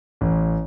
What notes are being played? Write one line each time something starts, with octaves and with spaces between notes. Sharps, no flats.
A1